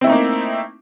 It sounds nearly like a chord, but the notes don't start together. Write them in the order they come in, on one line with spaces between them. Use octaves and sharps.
C4 E4 A3 D#4 A#3